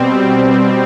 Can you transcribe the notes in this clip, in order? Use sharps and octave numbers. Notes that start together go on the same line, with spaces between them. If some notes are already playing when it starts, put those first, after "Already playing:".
Already playing: B2 G3 C4